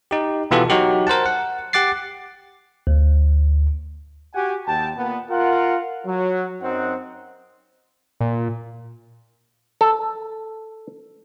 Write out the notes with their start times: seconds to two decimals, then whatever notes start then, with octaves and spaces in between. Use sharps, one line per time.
0.11 D#4 G4
0.51 B2 E3 B3 F4 G4 A4
0.70 F#3 D#4 F#4 G4
1.07 A#4 C5 F#5 A5
1.26 F#5
1.73 G4 F#5 D6 A6 C7
2.87 D2
4.34 F#4 G4 F#5 G#5
4.66 D#2 G5 A5
4.96 A#2 B3
5.30 F4 A#4 F#5
6.06 F#3
6.61 F#2 C4 D#4 F#5
8.20 A#2
9.81 A4